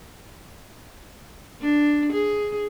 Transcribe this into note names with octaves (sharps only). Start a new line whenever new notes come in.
D4
G#4